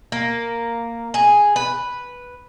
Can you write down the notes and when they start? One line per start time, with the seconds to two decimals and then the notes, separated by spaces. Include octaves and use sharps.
0.12 A#3
1.14 G#4
1.56 B4